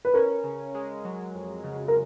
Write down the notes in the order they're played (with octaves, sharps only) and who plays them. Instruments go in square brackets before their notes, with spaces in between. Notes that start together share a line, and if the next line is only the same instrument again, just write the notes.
[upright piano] B4
[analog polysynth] C#4 [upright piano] A#4
[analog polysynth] C#3
G#3
F#3
F2
C#3
[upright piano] A#4